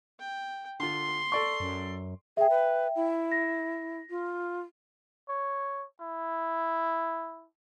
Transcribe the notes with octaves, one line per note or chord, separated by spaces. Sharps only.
G5
D3 F4 C6
A4 D5 C#6
F#2
G#4 E5 G5
B4
E4
A#6
F4
C#5
E4